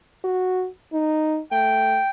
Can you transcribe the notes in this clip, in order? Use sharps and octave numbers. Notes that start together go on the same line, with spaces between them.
F#4
D#4
A3 G5